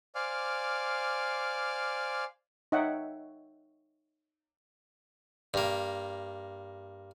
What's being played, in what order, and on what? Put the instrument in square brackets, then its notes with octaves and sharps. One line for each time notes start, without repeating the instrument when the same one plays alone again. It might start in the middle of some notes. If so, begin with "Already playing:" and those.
[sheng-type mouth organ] C5 D5 F5 G#5 D6 F6
[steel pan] D#4 C#5 E5 F#5 G5
[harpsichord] G2 A#3